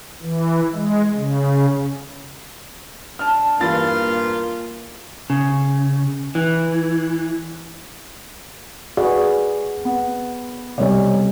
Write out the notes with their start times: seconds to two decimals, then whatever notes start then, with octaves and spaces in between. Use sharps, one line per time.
0.22 E3
0.73 G#3
1.16 C#3
3.19 B2 D4 A5 F6
3.61 E2 G2 A#3 F4 A6
5.30 C#3
6.35 E3
8.97 F#4 G#4 B4 D5
9.85 B3
10.78 B1 C3 G3 C#5 D5